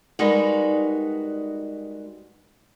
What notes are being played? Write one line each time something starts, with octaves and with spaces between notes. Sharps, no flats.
G3 G#3 D#4 F#4 A#4 B4